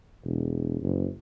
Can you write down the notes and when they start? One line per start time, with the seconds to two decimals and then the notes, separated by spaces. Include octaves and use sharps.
0.24 E1
0.82 F#1